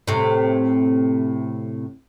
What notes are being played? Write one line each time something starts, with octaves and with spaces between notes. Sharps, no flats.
A2 C3